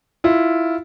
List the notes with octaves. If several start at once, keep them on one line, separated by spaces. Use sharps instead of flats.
E4 F4